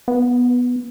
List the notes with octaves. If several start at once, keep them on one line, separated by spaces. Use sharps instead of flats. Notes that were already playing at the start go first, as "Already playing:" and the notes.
B3